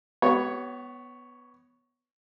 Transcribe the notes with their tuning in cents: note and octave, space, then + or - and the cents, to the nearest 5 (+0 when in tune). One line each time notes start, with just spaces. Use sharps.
B3 +0 F#4 +45 C#5 +0